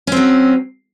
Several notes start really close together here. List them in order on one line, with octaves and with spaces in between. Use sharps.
C#4 C4 F#3